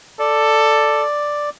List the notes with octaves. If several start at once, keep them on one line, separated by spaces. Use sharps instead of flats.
A4 D5